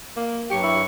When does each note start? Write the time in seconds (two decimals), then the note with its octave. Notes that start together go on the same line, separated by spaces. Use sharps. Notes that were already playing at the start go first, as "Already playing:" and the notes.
0.17 A#3
0.50 G2 F#3 G4 C#6
0.63 E4